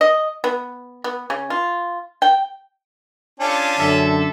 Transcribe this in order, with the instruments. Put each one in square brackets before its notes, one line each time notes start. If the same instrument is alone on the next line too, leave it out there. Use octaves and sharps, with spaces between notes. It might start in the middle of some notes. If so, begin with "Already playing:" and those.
[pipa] D#5
B3
B3
C#3
F4
G5
[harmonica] C#4 D4 [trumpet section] F4 G4 A4
[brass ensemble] F#2 D3 [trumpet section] A4 E5